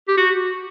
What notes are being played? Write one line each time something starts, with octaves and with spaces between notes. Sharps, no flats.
G4
F#4